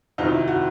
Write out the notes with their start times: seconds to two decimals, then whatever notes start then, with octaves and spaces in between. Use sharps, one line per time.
0.18 F2 C3 D#3 F#3 D#4
0.28 E4
0.48 F#4